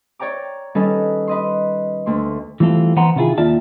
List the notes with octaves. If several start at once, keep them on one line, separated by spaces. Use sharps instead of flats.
C#5 D5 G5 A#5 D6
D#3 G3 C#4 D#4 A4 B4
B4 D#5 C6
D2 A3 C6
E3 G3 A3 C4 F4 A4
E3 B3 C5 F#5 A#5 C6
C3 D#3 C#4 E4 F4 G#4
D#2 F4 D5 E5 A5